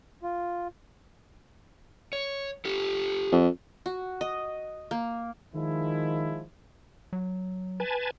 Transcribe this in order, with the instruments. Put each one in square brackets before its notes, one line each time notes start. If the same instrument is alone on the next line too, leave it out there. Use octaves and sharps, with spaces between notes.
[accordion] F4
[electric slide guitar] C#5
G4 A4
[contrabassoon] F2
[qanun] F#4
D#5
A#3
[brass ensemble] D#3 F3 G#3 E4
[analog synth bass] F#3
[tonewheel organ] B4 G#5 A5